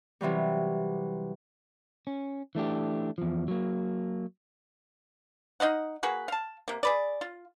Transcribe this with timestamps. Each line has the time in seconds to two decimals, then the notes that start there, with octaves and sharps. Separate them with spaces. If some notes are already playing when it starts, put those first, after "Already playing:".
0.21 C3 E3 F#3 G3
2.07 C#4
2.55 E3 A3 D4 G4
3.18 E2 F3
3.48 F#3 A#3
5.60 D#4 D#5 F5 F#5
6.03 A#3 F#4 G#4 B4
6.28 F5 A5
6.68 C3 A#3
6.83 G#4 B4 D5
7.21 F4